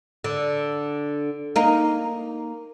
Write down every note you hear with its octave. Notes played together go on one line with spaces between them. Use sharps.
D3
A#3 D#4